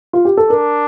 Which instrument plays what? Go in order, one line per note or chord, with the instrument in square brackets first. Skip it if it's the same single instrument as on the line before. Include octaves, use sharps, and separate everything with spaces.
[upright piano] F4
G4
A4
[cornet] D4 [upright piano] A#4